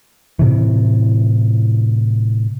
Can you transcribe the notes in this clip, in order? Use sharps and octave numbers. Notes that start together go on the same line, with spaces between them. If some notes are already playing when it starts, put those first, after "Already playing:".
A2 C3 E3